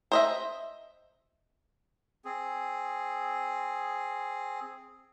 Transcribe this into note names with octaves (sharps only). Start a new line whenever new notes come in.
C5 D#5 E5
C4 G#4